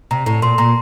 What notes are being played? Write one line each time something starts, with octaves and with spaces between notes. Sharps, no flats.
C3 A#5
A2 A#5
A#2 C6
A#2 A#5